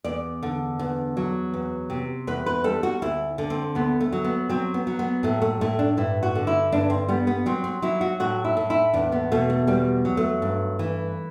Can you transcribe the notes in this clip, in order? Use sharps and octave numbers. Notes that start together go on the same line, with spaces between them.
E2 D5
D3
E2
F#3
E2
C3
E2 B4
B4
G3 A4
F#4
D2 E4
D3
C4
D2 B3
A3
F#3
B3
F#3 C4
B3
F#3
B3
A2 A3
A3
A2 A3
D4
G2 E4
F#4
D3
E4
G2 D4
C4
G3 B3
B3
F#3 C4
C4
F#3 E4
F#4
A2 F#4
E4
A2
E4
E2 D4
B3
B2 A3
A3
E2 G3
F#3
A3
G2
E3